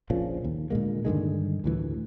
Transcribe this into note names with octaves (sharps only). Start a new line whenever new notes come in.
A#1 A#2 C#3 F3
D#2
A#2 D3 G#3 A#3
G2 D3 D#3 G#3
D2 A2 E3